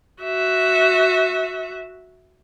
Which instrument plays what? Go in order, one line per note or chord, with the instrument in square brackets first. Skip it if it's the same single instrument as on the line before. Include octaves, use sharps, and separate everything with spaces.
[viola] F#4 E5